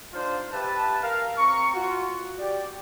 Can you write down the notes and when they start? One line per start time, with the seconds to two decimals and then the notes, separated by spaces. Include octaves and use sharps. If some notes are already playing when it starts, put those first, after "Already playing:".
0.13 D4 D#4 F4 C5 F5
0.52 G4 B4 E5 A5
1.02 A#4 F5
1.38 C4 A#5 C#6
1.74 F4 F#4
2.38 G4 D5